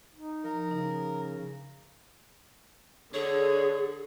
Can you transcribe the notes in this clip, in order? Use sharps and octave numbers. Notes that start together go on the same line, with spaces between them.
D#4
F3 A#4
C#3 D#4
D3 G#4 C#5